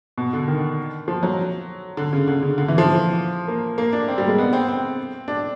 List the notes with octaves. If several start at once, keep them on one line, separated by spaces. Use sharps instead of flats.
B2
D3
D#3
F3
F#3
D3
C#3
D3
C#3
D3
E3
F3
A#3
A#3
D4
C4
G3
G#3
B3
C4
C4
D4